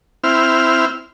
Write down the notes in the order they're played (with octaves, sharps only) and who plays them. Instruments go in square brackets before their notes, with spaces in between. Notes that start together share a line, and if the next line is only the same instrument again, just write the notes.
[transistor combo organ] C4 E4 F6